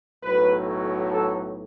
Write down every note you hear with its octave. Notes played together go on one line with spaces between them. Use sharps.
B1 A2 F#3 B4
A4